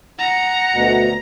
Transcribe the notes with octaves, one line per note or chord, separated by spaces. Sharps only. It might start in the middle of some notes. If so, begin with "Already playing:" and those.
F#5 A#5
D2 B2